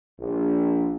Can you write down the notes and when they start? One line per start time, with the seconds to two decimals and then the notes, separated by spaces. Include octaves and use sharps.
0.19 A#1